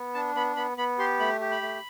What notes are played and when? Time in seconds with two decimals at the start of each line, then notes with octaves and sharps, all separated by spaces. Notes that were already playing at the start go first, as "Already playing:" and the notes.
Already playing: B3
0.14 D4 A5
0.35 B3 B5
0.56 B3 B5
0.78 B3 B5
0.99 G4 C6
1.20 A3 B5
1.40 G4
1.51 B5
1.61 A3